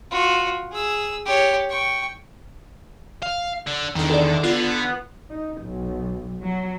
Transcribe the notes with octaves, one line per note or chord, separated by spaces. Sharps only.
F4 F#4
G#4 E6
G4 C#5
G5 C#6
F5
D3
E2 D3 D#3
A4 D5
D3 B3 F4
D#4
B1
F#3